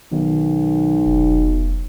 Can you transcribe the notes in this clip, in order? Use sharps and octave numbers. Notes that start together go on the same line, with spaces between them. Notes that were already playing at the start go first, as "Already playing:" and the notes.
B1 D#3
F1